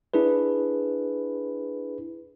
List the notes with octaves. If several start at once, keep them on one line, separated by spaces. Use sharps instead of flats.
D4 E4 G#4 B4